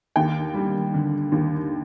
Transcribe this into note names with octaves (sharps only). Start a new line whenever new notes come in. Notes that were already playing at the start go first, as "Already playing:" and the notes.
D#2 G5
G3
D3
D#2